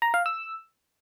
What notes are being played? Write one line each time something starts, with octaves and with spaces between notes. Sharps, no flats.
A#5
F5
E6